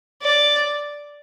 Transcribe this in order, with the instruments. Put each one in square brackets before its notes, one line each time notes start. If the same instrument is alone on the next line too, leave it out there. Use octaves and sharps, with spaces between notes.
[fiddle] D5